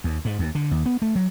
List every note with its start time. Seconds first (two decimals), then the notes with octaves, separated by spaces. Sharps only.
0.04 D#2
0.25 G#2
0.39 D#2
0.55 D3
0.71 D#2
0.86 B3
1.02 A3
1.16 F#3